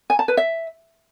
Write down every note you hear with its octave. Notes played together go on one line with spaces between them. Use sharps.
G#5
A5
B4
E5